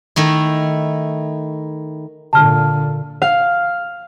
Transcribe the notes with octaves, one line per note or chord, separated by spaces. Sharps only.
D#3 A3 E4
A#2 D3 A5 F6
F5